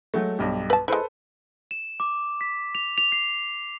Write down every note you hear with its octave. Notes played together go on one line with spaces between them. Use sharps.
F#3 G#3 A3
B1 G2 G4
B4 A5
G#3 E4 A4 B4 C5
E7
D6
B6
F7
F7
C7